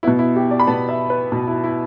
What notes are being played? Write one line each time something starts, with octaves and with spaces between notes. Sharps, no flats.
B2 B3 E4
E4
G4
D5
B5
B2 B3 A5
E5
B4
B2 B3
E4
E4